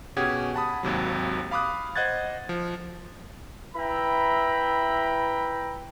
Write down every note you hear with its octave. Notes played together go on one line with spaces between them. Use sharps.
B2 C#4 G4 G#4 F#5 G#6
F#5 A5 B5 D#6
G#1 D#2 C3 F#3
F5 B5 D6 D#6 F#6
C5 D#5 F#5 F#6 G#6 A6
F3
E4 B4 E5 G5 A#5 B5